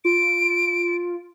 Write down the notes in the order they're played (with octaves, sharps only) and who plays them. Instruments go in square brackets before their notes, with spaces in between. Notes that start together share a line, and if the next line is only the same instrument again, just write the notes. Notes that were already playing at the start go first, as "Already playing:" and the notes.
[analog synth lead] F4 [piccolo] D7